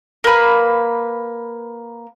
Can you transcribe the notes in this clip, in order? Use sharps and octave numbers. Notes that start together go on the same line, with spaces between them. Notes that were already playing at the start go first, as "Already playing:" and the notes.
A#3 B4